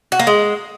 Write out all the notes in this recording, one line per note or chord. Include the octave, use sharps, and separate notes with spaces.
F#4
A#3
G#3